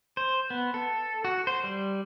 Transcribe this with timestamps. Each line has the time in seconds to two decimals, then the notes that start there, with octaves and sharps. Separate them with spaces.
0.17 C5
0.50 B3
0.74 A4
1.25 F#4
1.47 C5
1.64 G3